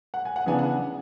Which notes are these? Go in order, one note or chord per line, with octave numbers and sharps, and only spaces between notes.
F#5
G#5
F#5
C#3 E3 B3 D4 G#5
F#5